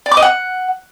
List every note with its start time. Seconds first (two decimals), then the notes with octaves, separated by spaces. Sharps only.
0.06 D5
0.11 D6
0.17 D#5
0.22 F#5